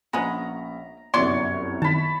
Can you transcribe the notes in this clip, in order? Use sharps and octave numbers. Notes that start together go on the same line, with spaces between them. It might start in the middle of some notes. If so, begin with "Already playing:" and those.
A#1 G#3 B3 C#4 A#5 B5
G1 C2 F#2 F#3 C#5 D5 C6 D6
D#3 A5 B5